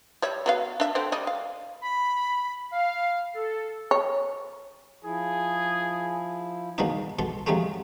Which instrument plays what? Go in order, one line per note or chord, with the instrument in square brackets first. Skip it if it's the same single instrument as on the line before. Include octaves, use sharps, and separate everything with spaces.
[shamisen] G3 C#5 E5
F#3 B3 F5
D4 E5
D3 C4 C5
G3 D#5
F5
[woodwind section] B5
F5
A4
[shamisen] C#5
[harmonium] F3 E4 [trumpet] G#4
[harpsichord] E2 B2 D#3 A#3 D#4
B2 A4 C6
F2 C3 F3 F#3 G#3 A3